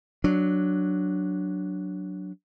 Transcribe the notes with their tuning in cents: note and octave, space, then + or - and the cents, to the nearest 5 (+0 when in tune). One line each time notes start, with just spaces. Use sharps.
F#3 +0 D4 +0